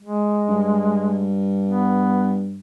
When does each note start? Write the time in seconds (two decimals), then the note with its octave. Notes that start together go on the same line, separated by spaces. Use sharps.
0.01 G#3
0.49 G2
1.65 B3